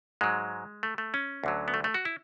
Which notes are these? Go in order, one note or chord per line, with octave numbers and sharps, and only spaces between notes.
G#2 F#3 G#3
A3
A3
C#4
D2 D3 F#3
B3
A3
A3
F#4
E4